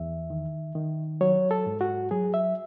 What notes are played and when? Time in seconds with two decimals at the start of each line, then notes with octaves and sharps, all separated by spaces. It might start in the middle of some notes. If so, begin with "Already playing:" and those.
Already playing: E2 E5
0.30 D#3
0.75 D#3
1.21 F#3 C#5
1.51 A4
1.66 G#2
1.81 F#4
2.11 F#3 G#4
2.34 E5